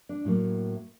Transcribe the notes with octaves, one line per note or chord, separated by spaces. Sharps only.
D4
A2 F#3 A#3